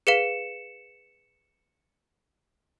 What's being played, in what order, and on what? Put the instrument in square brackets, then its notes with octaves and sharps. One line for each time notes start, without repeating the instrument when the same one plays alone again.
[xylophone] G#4 B4 F5 [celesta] C#7 E7